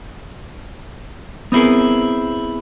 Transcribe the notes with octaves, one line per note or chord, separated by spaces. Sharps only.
B3 C4 E4 G#4 A#4